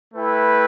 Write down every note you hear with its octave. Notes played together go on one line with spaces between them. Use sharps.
A3 E4 B4 G5